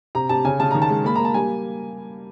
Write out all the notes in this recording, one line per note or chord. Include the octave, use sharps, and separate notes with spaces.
C3 A#5
C3 A5
C#3 G#5
C#3 A5
D#3 A#5
A5
G#3
A#3 B5
A#3 A#5
A5
G3 G#5